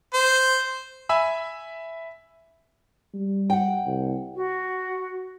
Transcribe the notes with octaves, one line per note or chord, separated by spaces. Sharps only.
C5
E5 G#5 B5 E6
G3
F#5 G5
C2
F#4